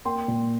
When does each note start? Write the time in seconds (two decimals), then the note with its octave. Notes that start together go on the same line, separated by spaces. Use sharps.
0.05 A#3 G5 C6
0.28 A#2